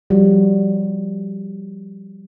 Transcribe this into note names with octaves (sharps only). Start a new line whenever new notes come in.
F3 G3 F#4